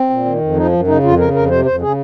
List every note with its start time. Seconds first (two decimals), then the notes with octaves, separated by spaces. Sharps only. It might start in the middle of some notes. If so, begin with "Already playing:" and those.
Already playing: C4
0.10 A#2
0.25 D#3
0.40 F2
0.56 F3 D#4
0.73 F#2
0.87 C#3 D#4
1.03 F2 F4
1.18 C#3 A#4
1.34 F2 A#4
1.50 C3 C5
1.65 F2 C5
1.80 C#3 G#4